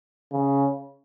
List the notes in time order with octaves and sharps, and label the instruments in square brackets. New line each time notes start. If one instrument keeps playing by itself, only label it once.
[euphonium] C#3